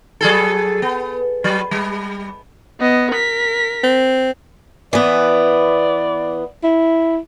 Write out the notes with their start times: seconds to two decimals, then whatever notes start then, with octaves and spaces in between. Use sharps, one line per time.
0.21 F#3 G#4 A4
0.82 B3
1.44 F#3
1.71 G3
2.80 B3 D#5
3.11 A#4 B6
3.83 C4
4.93 E3 B3 D5
6.63 E4